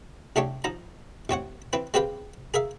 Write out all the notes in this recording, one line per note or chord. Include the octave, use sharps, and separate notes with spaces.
C2 A3 D4 G4 C#5
F3 D#4 A#5
A1 C4 C#5 F#5
E3 C4 B4
G#3 C4 G4 B4 F5 G5
G#4 A#4 E5 F5